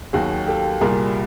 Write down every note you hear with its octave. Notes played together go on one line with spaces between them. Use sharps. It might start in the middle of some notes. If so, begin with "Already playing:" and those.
D#2 D#3 F#3 F#4 G#4
G4 A4
C2 A#2 G3 G#4 A#4